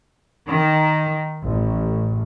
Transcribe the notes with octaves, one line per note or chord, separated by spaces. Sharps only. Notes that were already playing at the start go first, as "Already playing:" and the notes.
D#3
A1